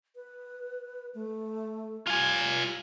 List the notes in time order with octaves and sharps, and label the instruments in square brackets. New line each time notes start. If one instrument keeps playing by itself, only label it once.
[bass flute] B4
A3
[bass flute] G3 [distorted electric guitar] F4 G#5